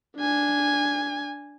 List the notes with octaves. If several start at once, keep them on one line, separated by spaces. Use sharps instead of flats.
D4 G#5